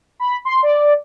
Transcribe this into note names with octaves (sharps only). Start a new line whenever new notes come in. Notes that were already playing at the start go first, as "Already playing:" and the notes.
B5
C6
D5